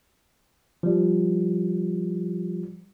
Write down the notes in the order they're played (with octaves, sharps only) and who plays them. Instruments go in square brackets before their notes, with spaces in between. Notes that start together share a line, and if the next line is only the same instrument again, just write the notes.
[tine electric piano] F3 G3